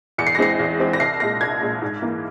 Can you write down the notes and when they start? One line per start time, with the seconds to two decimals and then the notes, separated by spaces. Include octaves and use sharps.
0.18 E2 C#7
0.27 C7
0.35 A#6
0.39 E3 G#3 C4 C7
0.59 E2
0.79 E3 G#3 C4
0.93 A#6
1.00 C2 C7
1.20 A#2 G#3 A#6
1.41 C2 G#6
1.61 A#2 G#3
1.82 G#2
2.02 E3 A#3